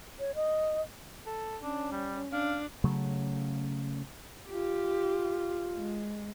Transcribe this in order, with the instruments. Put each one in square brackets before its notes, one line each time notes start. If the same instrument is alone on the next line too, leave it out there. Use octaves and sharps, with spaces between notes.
[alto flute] C#5
D#5
[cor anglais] A4
[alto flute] C#4 [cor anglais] D4
[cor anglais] G3
[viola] D4 [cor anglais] F5
[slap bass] C#3 F#3 A3
[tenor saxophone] F4 [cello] G4
[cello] G#3